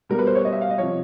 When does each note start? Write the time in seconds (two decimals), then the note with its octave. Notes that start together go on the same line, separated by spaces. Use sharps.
0.09 B2 G3 A#4
0.19 B4
0.27 C5
0.35 C#5
0.45 D#5
0.52 E5
0.61 F5
0.70 D#5
0.78 C3 F3 C#5